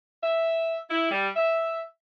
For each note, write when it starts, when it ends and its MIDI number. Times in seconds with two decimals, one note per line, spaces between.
0.23 0.78 76
0.90 1.10 64
1.11 1.28 55
1.36 1.80 76